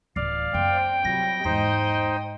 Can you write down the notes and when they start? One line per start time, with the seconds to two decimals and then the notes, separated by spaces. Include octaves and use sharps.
0.16 D1 E3 D5 F5
0.54 F#2 A#3 C4 G5
1.05 C3 F#3 G3 F4 A#6
1.45 E2 G#2 D#4 C5 D#5